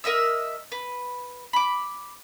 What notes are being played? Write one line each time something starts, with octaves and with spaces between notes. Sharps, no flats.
A#4 D#5 E5 E6
B4
B5 D6